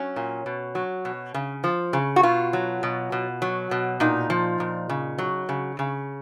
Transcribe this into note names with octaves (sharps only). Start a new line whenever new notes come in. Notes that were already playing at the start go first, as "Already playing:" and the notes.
Already playing: F#3 C#4
A#2
B2
F#3
B2
C#3
F3
C#3
F#4
B2 F4
F#3
B2
B2
F#3
B2
A#2 D#4
F3
A#2
C#3
F#3
C#3
C#3